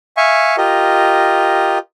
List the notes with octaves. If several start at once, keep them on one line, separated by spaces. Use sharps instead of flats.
E5 F5 G#5 C#6
F4 G4 A#4 D#5